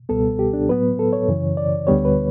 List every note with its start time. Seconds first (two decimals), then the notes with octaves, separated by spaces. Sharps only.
0.09 C#2 B2 G3 B3 A4
0.39 G4
0.53 D4
0.69 A2 F#3 B3 B4
0.99 A4
1.13 C#5
1.28 F#2 C#3 E3
1.57 D5
1.87 D2 D3 G3 B3 C#5
2.05 B4